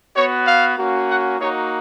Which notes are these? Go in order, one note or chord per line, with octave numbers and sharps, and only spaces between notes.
B3 F#4 C#5
F5
A#3 C#4 F#4
F#5
A#3 D#4 F#4 C#5